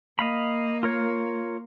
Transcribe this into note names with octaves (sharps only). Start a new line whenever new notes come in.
A#3 D#5 F5 B5
F4 A#4 C#5